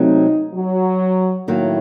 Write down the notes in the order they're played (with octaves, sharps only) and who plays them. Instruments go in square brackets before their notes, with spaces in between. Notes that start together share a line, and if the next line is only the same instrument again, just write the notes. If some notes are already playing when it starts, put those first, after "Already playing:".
Already playing: [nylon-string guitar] C3 F#3 A3 C4 [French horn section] D#4
[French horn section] F#3
[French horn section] A2 [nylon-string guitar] D#3 F#3 A#3